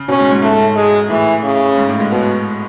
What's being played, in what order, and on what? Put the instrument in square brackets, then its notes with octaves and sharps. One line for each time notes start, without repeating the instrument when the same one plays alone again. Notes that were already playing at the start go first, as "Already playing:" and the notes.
Already playing: [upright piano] C#3
[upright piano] B2 [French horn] C#4
[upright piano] G#2
G#2
[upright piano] G#2 [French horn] A3
[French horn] G#3
[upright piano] A2 [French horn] E3
[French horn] C#3
[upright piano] G#2
A2
G#3
[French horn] B2 [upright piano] B3